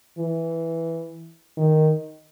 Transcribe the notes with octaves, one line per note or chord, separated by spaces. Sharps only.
E3
D#3